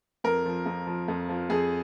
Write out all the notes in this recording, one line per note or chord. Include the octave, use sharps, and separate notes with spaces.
F2 A#4
F3
F2
F3
F2
F3
F2 G#4